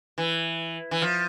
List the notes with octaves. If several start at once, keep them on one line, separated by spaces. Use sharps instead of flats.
E3
E3
F3